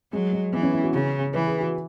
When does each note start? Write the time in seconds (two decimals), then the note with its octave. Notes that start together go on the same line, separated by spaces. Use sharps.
0.12 F#3 G#3
0.33 G#3
0.53 E3 B3
0.63 C#4
0.73 E4
0.83 F#4
0.93 C#3
1.33 E3 B4
1.47 G#4
1.60 F#4